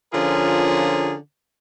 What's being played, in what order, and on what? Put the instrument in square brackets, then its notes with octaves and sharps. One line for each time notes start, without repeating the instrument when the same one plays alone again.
[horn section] D3 F3 C#4 F4 G#4 A#4